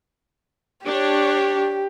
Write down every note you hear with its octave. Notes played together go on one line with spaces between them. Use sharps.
D4 G4 C#5